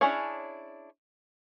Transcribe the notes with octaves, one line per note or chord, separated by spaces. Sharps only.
C#4 D4 E4 G#4 C#5